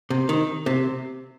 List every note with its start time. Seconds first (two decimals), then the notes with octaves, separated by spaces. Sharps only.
0.10 C3
0.29 D#3
0.66 C3